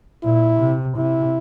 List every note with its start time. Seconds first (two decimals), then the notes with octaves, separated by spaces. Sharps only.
0.24 A#2 E4
0.60 C3
0.97 C3 E4